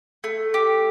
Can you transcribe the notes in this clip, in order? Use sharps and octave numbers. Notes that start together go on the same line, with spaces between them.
A3
G4